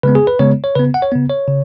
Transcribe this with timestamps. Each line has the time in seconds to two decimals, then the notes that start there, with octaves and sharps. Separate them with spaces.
0.03 C#3 G#3 B3 B4
0.15 G#4
0.27 B4
0.39 C#3 G#3 B3 C#5
0.64 C#5
0.75 C#3 B3 B4
0.94 F#5
1.02 C#5
1.12 C#3 B3
1.30 C#5
1.48 C#3